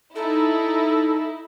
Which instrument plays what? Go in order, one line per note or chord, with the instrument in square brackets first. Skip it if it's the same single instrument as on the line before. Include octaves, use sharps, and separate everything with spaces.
[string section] D#4 E4 [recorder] A4